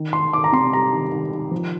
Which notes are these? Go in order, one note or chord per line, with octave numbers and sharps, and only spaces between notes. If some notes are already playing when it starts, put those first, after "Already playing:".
Already playing: D#3
D#3 C6
D#3 D6
A#5
C3 C6
G3 A#5
D#3
D#3
D#3
F3